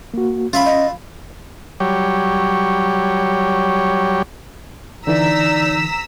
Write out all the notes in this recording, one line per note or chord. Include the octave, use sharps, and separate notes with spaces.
A#3 F#4
C#4 F4 E5 B5
D#5
F#3 G3 G4 C#5
D3 E3 D#4 D5 A#5 E6 B6